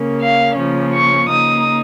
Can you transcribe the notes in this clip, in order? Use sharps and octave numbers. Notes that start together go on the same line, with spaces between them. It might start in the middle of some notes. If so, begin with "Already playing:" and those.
Already playing: C#3 A#3 C#4
F5
C#3 F3 A#3 C#4
C#6
C#3 A#3 D#4 D#6